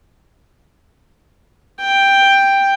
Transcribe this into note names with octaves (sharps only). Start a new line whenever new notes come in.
G5